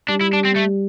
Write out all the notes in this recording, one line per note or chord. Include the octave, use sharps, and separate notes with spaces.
G3 D4
E4
D4
C4
A3